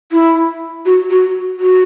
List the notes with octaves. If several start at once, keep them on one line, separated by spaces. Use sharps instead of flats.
E4
F#4
F#4
F#4